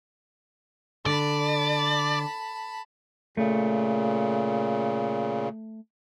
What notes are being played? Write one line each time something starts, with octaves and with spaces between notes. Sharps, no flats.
D3 D5 A5 B5
A#2 C#3 A3